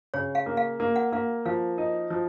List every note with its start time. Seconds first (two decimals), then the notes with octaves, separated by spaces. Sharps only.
0.14 C#3 C#5
0.35 F5
0.46 A#3
0.57 F5
0.80 A#3
0.96 F#5
1.12 A#3 F5
1.45 F3 F5
1.78 D#4
2.10 F3